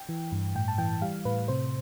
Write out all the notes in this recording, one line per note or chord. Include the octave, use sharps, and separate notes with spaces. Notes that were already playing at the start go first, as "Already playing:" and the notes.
Already playing: G5
E3
G2
A2 G5
A5
E3 G5
G3 F5
A2 B4
C3 C5